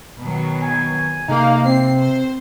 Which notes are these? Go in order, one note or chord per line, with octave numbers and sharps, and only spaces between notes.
B2 D#3 F#3
G#5
C3 A#3 D#4 F5
C4 C7
C5